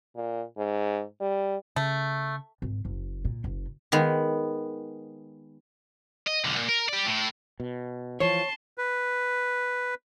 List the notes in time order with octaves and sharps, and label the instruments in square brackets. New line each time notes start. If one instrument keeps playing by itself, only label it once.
[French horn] A#2
G#2
G3
[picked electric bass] C#3 [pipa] A3
[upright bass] G#1
F#1
A#2
F#1
[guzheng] D#3 G#3 B3
[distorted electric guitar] D#5
B1 D3
A#2
A#4
G4 D5
A2 E4
[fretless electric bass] B2
[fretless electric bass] E3 F3 [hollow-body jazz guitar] C#5 [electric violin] A5 C6
[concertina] B4